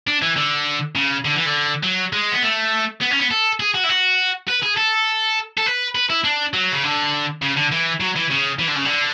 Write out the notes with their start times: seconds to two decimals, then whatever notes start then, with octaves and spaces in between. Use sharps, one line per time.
0.07 D4
0.22 E3
0.36 D3
0.95 C#3
1.25 D3
1.35 E3
1.46 D3
1.83 F#3
2.13 G#3
2.32 B3
2.43 A3
3.01 B3
3.11 C#4
3.19 B3
3.31 A4
3.60 G#4
3.75 F#4
3.84 E4
3.89 F#4
4.49 B4
4.63 G#4
4.77 A4
5.57 A4
5.66 B4
5.95 B4
6.10 E4
6.24 D4
6.54 F#3
6.72 C#3
6.84 D3
7.42 C#3
7.57 D3
7.72 E3
8.00 F#3
8.16 E3
8.31 C#3
8.59 E3
8.68 D3
8.76 C#3
8.85 D3